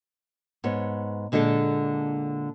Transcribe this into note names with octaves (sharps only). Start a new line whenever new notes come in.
G#2 B3 C#5
A#2 D3 G#3 D4 A4